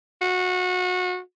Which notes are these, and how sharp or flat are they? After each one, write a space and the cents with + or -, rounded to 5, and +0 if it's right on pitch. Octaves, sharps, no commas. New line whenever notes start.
F#4 -25